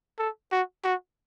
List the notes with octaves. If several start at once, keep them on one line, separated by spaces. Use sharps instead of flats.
A4
F#4
F#4